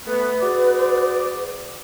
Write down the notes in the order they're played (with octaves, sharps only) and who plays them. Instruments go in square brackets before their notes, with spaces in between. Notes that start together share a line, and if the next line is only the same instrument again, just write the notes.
[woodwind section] A3 B3 [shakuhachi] B4
[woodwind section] F#4 G#4 D5